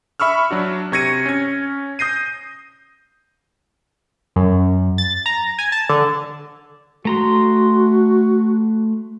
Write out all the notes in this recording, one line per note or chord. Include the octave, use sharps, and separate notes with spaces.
E5 B5 C#6 E6 F6
F#3 D4 F#4
C3 C#6 G#6 A#6 C#7 D#7
C#4 G#6
D#6 G6 A#6 C7 D#7
F#2
A6
A#5
G#5
A5
D3
A3 F#4 A#5 C6